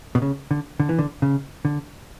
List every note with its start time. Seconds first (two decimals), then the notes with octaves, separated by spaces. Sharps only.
0.15 B2
0.22 C#3
0.51 D3
0.80 D3
0.89 E3
0.98 D3
1.22 C#3
1.65 D3